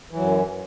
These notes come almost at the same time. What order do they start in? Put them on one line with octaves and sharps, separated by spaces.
E3 F#3 F#2